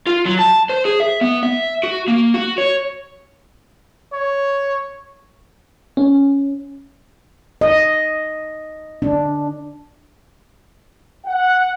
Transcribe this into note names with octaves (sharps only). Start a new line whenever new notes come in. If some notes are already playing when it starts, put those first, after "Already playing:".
F4
F#3
A5
C5
G#4
E5
B3
E5
F#4
A#3
F#4
C#5
C#5
C#4
D#5
D4
F#5